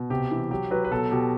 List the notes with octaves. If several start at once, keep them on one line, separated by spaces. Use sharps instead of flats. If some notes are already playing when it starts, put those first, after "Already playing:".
Already playing: B2
C3 G4
E3
F#3 G4
F#3 B4
B4
B2 A4
B2 G4